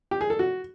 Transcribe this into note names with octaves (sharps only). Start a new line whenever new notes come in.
G4
G#4
A4
F#4